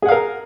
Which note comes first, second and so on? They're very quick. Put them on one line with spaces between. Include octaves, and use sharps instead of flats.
G#4 F#5 F5 A#4